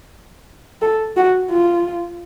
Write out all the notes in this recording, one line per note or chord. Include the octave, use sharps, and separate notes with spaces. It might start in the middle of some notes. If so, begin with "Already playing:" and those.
A4
F#4
F4